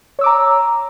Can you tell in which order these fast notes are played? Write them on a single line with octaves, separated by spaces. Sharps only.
C#5 E6 D6 A#5